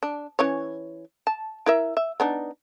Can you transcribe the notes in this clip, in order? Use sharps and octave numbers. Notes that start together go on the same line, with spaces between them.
D4
E3 C#4 C#5
A5
E4 A#4 E5
E5
B3 D4 D#4